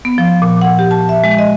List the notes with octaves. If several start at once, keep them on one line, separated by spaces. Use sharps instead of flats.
B3
F3
A#2
F#5
G4
A5
E5
G#3
D#5